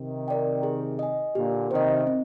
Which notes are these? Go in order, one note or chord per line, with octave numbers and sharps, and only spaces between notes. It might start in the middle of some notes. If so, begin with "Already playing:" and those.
Already playing: C3 D#3
A#4 D5 G5
G#4
D#5 G#5
A#2 D3 G4
C3 D#3 C5 D#5
C4